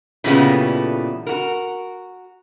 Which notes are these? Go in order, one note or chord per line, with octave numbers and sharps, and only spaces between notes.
A#2 C#3 E3 G3 A3 B3
F#4 A#4